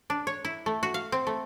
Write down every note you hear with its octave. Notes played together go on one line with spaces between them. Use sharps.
D4
C#5
E4
A3
F#4
F5
C4
A3